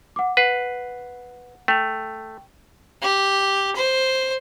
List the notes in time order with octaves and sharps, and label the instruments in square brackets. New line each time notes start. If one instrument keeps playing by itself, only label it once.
[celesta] F#5 D6
[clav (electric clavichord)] B4 [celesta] F#5 C7
[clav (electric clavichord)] A3 [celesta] G5 F7
[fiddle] G4
C5